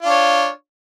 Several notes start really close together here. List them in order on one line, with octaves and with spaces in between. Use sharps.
F4 D4 C#5